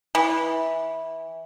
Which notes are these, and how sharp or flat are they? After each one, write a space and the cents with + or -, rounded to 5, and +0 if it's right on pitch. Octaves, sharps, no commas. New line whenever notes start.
E3 -15